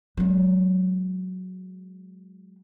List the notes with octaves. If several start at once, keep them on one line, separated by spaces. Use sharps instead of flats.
F#3 G#3